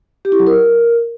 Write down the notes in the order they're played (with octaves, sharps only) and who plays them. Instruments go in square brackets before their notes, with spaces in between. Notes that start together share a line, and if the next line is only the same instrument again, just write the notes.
[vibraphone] G4
E4
F#3
A#4